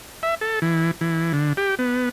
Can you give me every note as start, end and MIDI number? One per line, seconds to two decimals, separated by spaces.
0.23 0.35 76
0.41 0.59 69
0.62 0.91 52
1.01 1.32 52
1.33 1.53 50
1.57 1.75 67
1.79 2.09 59